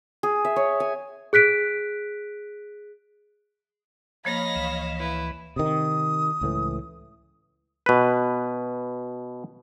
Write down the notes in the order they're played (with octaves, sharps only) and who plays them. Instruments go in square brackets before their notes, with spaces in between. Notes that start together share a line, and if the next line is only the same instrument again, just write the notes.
[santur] G#4
E5
C#5
G#5
[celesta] G#4 F#6 B6 D7
[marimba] F3 A#3 [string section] C#5 D#5 F5 [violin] B5 A#6
[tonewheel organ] C#2 E3
[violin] E4 B4
[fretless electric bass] C3 D#3 [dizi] D#6
[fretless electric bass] C#2 A2 E3
[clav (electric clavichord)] B2 B4